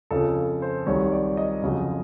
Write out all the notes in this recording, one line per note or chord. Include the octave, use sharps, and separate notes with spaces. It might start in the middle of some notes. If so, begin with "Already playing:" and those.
F2 C#3 F3 A4
C5
C2 C3 D#3 F#3 C#5
D5
D#5
F2 C#3 F#3